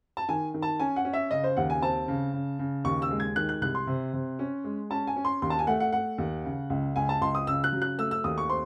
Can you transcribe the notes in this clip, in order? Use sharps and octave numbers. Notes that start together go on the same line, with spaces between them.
A5
D#3 G#5
D#3
A5
C#4 G#5
F#5
C#4
E5
C#3 D#5
C5
D#2 F#5
G#5
C4 A5
C#3
C#3
C#3
D#2 C#6
E6
G#3
G#6
D#3 F#6
F#6
C2 F#6
C6
C3
C3
C#4
G#3
C#4 A5
G#5
C#4
C6
D#2 C6
A5
G#5
A3 F#5
F#5
A3 F#5
D#2
C#3
C#2
C#2 G#5
A5
C#2 C6
D#6
C#3 E6
F#6
F#3
F#6
A3 E6
E6
D#2 D#6
C#6
C4 C6